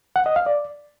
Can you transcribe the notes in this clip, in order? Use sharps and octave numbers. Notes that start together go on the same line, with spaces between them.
F#5
D#5
F5
D5